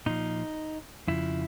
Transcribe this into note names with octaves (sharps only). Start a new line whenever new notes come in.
A#2 F3 D#4
F2 C#3 F3 E4